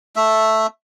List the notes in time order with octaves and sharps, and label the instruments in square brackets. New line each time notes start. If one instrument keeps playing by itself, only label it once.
[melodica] A3 E5